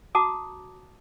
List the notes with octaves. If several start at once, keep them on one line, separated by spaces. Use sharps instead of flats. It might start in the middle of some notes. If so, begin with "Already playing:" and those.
F#4 A5 A#5 D6 D#6